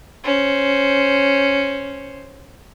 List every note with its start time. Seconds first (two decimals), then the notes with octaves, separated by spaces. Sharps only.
0.23 C#4 C5